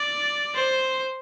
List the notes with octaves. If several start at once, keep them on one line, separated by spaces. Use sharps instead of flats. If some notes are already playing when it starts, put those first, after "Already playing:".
Already playing: D5
C5